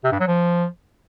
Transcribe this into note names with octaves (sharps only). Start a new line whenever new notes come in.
C3
G2
F#3
F3